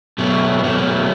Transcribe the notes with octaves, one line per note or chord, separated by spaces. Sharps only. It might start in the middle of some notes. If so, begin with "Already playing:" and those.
B2 F#3 A3
B3
B2 F#3 A3